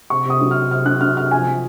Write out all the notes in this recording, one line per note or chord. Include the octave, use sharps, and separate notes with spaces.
C3 C#6
C3 D#6
F#3
F6
C3
C3 F6
F#3 F#6
F#3 F6
C3 F6
F3 G#5
F3